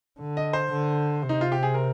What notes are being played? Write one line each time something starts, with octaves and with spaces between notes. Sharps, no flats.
D3
D#5
C5
D3
C3
D#4
F4
G4
G#4
A#4